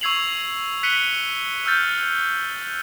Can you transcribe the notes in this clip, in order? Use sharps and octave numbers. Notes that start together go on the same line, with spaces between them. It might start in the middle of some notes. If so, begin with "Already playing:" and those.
C#6 E6 G#6 C7 F7 F#7
F#6 B6 C#7 D#7 F#7 G7
E6 F6 G6 A6